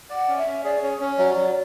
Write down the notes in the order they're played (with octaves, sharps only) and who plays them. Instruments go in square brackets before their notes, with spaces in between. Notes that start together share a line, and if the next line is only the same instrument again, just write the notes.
[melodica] D5 [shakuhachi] F#5
[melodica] C#4
[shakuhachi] E5
[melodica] C#4
[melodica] G#4 [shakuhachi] D5
[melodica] C#4 [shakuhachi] C#5
[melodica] C#4 [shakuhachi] C#5
[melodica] F#3 [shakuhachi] D5 E5
[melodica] F#3